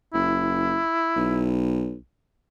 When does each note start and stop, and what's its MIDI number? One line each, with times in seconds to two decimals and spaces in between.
0.14 0.81 30
0.14 1.58 64
1.17 1.97 35